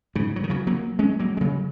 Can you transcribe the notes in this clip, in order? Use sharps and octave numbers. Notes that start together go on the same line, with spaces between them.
G#2 C#3
F#3
D#3
C#3 F#3
F#3 A#3
G#3 C#4
F#3 A#3
G#3
C#3 F#3